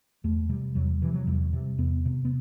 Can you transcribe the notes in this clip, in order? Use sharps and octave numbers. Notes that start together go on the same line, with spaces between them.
E2 A3
C3 G3
E2 F#3
C3 E3
F#3
E2 G3
C3
E2 B3
C3
B3